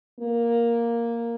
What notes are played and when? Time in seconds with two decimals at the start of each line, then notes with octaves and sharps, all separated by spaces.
0.20 A#3